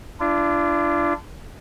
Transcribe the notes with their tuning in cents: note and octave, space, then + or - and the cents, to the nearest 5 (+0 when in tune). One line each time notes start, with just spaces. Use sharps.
D4 +0 F4 -45